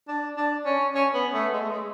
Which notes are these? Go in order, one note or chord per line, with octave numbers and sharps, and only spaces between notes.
D4
D4
C#4
C#4
B3
A3
G#3
A3
G#3